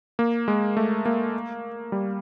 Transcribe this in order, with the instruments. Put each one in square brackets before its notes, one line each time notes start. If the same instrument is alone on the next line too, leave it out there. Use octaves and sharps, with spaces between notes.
[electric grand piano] A#3
G#3
A3
A#3
G3